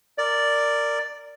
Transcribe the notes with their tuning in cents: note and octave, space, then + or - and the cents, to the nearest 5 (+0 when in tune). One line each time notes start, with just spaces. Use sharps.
A#4 -15 D5 +0